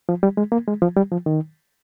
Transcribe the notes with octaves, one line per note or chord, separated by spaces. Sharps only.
F3
G3
G#3
A#3
G#3
F3
G3
F3
D#3